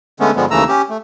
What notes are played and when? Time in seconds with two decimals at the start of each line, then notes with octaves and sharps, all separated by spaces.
0.20 D3 G#3 A3 B3 C#4
0.36 G2 D3 F3 G3 G#3 B3
0.51 D#2 C#3 E3 A3 A#5 E6
0.69 C#4 G4
0.90 A3